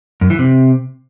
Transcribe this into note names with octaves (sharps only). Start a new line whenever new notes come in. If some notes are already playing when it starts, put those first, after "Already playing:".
F#2
E3
C3